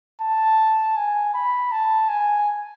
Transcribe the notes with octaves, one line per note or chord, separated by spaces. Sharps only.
A5
G#5
B5
A5
G#5